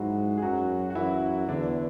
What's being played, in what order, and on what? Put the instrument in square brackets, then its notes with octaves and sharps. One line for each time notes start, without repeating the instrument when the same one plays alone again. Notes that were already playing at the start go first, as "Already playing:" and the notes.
Already playing: [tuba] G#2 [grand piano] F#3 G#3 E4 F#4
[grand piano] G#4
[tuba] F#2 [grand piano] F#3 F#4
[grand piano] F#4
[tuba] F#2 [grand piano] E3 E4
[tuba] E2 [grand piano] D3 D4